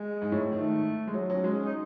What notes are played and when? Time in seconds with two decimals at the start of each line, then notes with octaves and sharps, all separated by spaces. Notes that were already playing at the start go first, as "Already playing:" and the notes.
Already playing: G#3
0.22 G#2
0.32 A2
0.52 D#3 A3
1.07 G#3
1.14 F#3
1.29 F#3 C#4
1.44 G#3
1.64 D#4